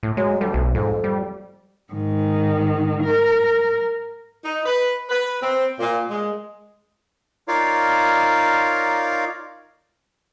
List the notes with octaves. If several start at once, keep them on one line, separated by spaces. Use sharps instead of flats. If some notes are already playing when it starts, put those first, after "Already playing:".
A2
F#3 G#3
D2 G3
B1
F2 G#2
G3
G#2 D#3
A#4
D#4
B4
B4
C4
A#2
G#3
D#4 F4 A#4 C#5 D5 F5